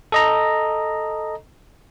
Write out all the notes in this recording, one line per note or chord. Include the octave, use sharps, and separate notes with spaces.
A4 D#5 A#5